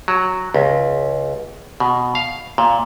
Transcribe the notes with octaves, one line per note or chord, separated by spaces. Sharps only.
F#3
C#2
B2
F5
A#2